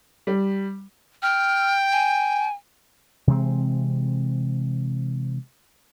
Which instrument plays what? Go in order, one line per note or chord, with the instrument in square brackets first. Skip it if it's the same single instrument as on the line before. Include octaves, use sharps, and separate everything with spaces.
[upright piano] G3
[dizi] G5 [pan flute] F6
[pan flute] G#5
[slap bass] C3 E3 G#3 C4